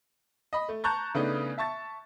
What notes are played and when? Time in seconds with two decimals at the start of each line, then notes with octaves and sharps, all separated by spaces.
0.53 D#5 B5
0.69 A3
0.84 A5 A#5 C#6 F#6 G6 A6
1.15 C#3 A3 B3 D4 D#4
1.58 E5 A5 C#6 A6